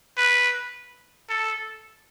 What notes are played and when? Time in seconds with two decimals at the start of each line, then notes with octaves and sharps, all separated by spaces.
0.17 B4
1.29 A4